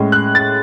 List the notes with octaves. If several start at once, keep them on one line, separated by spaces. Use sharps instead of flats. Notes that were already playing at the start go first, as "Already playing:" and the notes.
Already playing: A2 G#3 C#4
F#6
A6